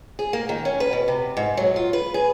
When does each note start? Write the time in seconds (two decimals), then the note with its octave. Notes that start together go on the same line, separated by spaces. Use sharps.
0.19 G#4
0.33 A#3
0.49 D#3
0.65 C#4
0.80 B4
0.93 B2
1.08 C3
1.37 G#2
1.57 F#3
1.76 F4
1.93 B4
2.14 G#4